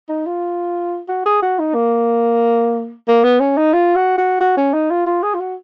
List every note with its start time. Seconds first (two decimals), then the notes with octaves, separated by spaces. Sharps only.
0.09 D#4
0.26 F4
1.08 F#4
1.26 G#4
1.42 F#4
1.59 D#4
1.75 A#3
3.08 A#3
3.24 B3
3.40 C#4
3.57 D#4
3.73 F4
3.96 F#4
4.18 F#4
4.41 F#4
4.57 C#4
4.74 D#4
4.90 F4
5.06 F4
5.23 G#4
5.34 F4
5.40 F#4